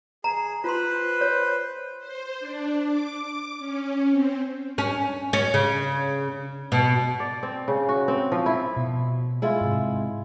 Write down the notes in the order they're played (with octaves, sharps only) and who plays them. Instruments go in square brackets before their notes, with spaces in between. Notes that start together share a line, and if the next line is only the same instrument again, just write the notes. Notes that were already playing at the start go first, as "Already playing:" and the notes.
[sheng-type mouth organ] G#4 [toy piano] A#5
[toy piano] F4 C6 [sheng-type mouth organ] B4 C5
[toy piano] C#5
[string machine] C5
D4
D6
C#4
C4
[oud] C#4
C#4
C#3
B2
[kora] D5
C4
C#3
F#4
C4
F3
E4
[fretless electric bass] B2
[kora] G#3 E4 F4
[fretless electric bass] G#2 C3